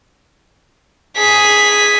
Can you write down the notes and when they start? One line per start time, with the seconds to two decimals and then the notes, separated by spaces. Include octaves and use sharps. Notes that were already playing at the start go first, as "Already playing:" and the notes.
1.18 G#4 B6